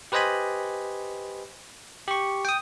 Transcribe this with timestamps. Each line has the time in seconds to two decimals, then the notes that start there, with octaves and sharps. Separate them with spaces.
0.12 G4 B4 C5 D#5 G#5 B5
2.08 G4 C#6
2.45 G5 D#6